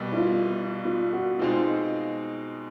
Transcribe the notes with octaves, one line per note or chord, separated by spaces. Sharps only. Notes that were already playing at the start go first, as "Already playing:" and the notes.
Already playing: C2 B2 G3
E4
F4
F4
F#4
B2 G#3 C4 D#4 F4